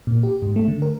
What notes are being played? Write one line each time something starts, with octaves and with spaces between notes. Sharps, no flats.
A#2
G4
G#2
A3
D3
A#4